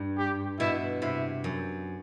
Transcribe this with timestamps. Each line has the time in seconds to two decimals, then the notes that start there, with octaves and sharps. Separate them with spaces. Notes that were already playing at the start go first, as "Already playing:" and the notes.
Already playing: G2
0.18 G4
0.59 B2 E4
1.01 C3 E4
1.44 F#2